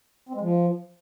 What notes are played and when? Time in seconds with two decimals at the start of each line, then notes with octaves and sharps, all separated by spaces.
0.29 C4
0.35 G#3
0.41 F3